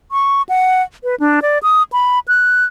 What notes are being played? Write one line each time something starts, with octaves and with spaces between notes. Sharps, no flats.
C#6
F#5
B4
D4
D5
D#6
B5
F#6